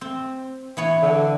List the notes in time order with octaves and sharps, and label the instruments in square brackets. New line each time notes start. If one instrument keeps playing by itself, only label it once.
[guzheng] C4
E3 B3 C#5
[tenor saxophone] D3